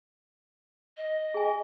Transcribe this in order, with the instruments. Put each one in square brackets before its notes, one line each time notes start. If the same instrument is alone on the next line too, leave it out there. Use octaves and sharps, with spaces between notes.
[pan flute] D#5
[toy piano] G#4 G#5